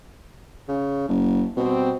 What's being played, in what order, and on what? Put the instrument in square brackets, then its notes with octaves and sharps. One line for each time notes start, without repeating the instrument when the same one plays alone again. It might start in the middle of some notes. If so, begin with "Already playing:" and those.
[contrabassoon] C#3
F#1
[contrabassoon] B2 [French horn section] G3 C4